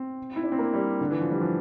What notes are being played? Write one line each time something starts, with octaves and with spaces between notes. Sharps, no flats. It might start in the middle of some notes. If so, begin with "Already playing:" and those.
Already playing: C4
E4
D4
C4
A#3
G3
D3
E3
F3
G3
F3